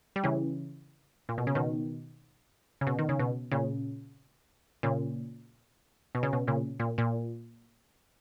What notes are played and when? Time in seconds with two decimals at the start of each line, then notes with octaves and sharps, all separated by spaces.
0.16 G3
0.24 C#3 E3
1.29 A#2
1.38 B2
1.47 C#3
1.55 B2 D#3
2.81 C#3
2.87 B2
2.99 D#3
3.09 C#3
3.19 B2
3.52 A#2 C#3
4.83 A#2 C#3
6.15 B2
6.23 C#3
6.33 B2
6.47 A#2 C#3
6.80 A#2
6.98 A#2